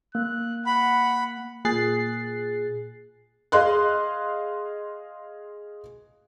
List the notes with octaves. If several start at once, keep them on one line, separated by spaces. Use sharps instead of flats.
A#3 F#6
F#5 B5
A#2 G#4 F#6 A6 C7
G#4 D#5 F5 C6 F#6